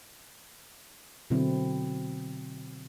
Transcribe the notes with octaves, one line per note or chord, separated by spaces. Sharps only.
B2 D3 F#3 C4 E4